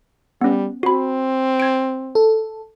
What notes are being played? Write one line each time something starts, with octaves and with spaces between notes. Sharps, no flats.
G3 B3 C#4
C4 F#4 B5
G#6 D7
A4